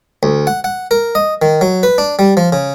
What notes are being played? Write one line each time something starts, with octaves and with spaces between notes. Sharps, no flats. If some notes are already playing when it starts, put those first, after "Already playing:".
D2
F#5
F#5
A#4
D#5
D#3
F#3
B4
D4
G3
F3
C#3